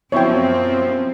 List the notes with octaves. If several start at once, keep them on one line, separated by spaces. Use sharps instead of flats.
F#2 B2 F3 C4 E4 C5 C#5 G5